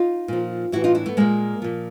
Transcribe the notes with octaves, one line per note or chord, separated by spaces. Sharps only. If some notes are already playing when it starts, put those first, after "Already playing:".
Already playing: D#4 F4
A#2 F3
A2 E3 E4 F#4
D#4 F4
D4 E4
A3 B3
A#2 F3 G#3 A#3
A#2 F3